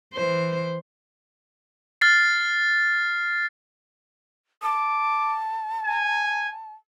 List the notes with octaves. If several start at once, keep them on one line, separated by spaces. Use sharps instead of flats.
E3 C5
F6 A6 C7
A5 D6
G#5